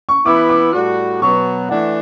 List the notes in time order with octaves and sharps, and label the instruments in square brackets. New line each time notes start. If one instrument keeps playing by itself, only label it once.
[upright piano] C#6
[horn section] E3 B3 E4 [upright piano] D6
[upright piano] D6
[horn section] A2 G3 D4 F#4
[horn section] B2 F#3 B3 [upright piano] C#6
[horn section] E3 A3 D4 [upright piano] F#5